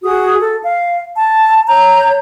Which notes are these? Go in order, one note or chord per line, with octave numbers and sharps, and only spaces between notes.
F#4 G#4 D#6
A4
F5
A5
C#5 A#5 G6